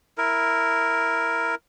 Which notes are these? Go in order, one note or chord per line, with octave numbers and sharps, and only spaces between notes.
E4 A#4